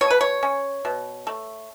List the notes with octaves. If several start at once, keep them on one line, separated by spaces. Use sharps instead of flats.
B2 C#5
B4
C#5
C#4
B2
A3